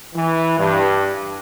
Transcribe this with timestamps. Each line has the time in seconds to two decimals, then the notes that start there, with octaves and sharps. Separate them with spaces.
0.15 E3
0.58 G2